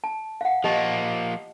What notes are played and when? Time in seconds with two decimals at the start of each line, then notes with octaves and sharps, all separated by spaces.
0.04 A5
0.41 F5 F#5
0.64 F3 A#3 G4 D#5 A5